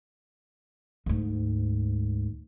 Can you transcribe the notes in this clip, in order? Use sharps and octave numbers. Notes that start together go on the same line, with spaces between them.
D2 G#2